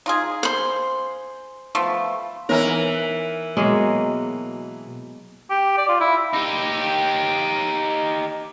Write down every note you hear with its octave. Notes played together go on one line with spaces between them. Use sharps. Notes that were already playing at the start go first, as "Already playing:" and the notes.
D#4 F4 G#4
C5 C6
F3 A3 B3
E3 B3 D#4 A#4 C#5
B2 F#3 G#3 A#3
G4
D5
F4
E4
D#4 G4